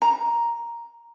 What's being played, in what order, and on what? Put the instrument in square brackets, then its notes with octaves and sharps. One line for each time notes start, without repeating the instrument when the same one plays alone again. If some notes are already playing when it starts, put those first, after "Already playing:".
[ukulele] A#5